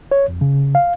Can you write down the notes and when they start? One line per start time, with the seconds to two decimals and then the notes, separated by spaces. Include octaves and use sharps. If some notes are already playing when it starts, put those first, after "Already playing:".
0.11 C#5
0.28 F2
0.41 C#3
0.75 F5